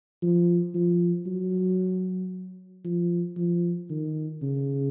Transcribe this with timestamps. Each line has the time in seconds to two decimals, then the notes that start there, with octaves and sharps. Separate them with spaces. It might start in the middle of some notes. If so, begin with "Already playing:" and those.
0.22 F3
0.75 F3
1.27 F#3
2.85 F3
3.37 F3
3.90 D#3
4.42 C#3